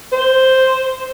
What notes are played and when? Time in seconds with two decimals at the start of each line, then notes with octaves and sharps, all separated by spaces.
0.12 C5